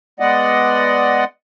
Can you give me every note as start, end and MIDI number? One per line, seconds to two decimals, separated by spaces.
0.20 1.25 56
0.20 1.25 59
0.20 1.25 74
0.20 1.25 75
0.20 1.25 78